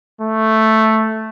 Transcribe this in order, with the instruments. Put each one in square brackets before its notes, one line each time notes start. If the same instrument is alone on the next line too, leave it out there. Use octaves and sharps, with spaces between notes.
[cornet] A3